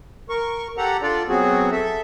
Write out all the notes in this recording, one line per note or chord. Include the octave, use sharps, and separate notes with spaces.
A#4 C#6
G4 A4 F#5 A#5
D4 F4 A4 D5
F#3 B3 C4 F#4 G#4
A4 E5